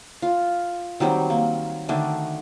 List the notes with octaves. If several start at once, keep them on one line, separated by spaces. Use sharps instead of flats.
F4
D#3 F#3 G3 C4
A#3
D3 D#3 A3 D4